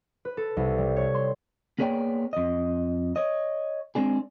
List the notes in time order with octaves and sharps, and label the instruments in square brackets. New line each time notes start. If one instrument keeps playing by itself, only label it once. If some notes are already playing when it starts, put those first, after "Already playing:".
[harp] B4
A4
C2
G3
C#5
C6
[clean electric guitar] A#3 B3 G#4 C#5 D5 G5
F2 D#5
C#5 D#5
G#3 C4 D4 G#4